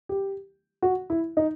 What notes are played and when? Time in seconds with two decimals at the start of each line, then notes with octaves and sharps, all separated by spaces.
0.09 G4
0.82 F#4
1.10 E4
1.37 D#4